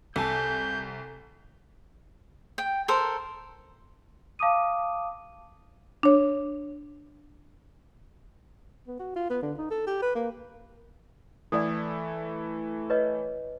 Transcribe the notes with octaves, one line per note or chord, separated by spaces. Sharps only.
C2 A4 G#5 A5 G6
G5
A4 A#4 C5
F5 A5 D6 D#6 D#7
D4 C#5
B3
F#4
F4
B3
D3
D#4
A4
G4
B4
A#3
E3 A3 E4 A4 D5 F#5
B4 C#5 D#5